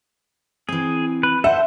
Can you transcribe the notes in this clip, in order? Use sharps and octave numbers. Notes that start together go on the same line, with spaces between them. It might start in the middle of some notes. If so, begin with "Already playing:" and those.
E3 C4 G#4
B4
A4 C5 E5 F#5